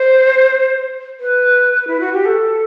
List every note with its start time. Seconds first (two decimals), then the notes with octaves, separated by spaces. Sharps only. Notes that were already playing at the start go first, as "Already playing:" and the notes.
Already playing: C5
1.20 B4
1.87 E4
2.00 F#4
2.13 G4
2.25 A4